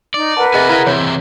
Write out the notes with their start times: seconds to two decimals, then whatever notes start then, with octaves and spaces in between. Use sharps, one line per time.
0.14 D#4 D5
0.37 A#4 B4 F#5 A5
0.54 C3 G#4 D#5 E5 G#5
0.69 E4 G#4 E5 F5
0.86 C3 E3 C#5